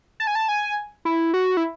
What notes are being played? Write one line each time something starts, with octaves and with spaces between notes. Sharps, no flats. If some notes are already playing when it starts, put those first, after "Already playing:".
A5
G#5
A5
G#5
E4
F#4
E4